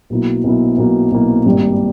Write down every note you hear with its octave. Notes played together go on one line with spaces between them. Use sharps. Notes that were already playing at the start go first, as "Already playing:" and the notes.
B1 B2 A#3 E4
B1 B2 A#3 E4
B1 B2 A#3 E4
B1 B2 A#3 E4
G#1 G2 G3 A#3